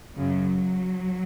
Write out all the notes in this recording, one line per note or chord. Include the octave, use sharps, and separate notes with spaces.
F#2 C#3 F#3